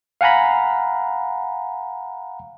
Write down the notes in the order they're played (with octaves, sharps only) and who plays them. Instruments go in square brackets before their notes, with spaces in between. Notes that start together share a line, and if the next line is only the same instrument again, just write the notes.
[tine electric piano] F5 F#5 G#5 A#5 B5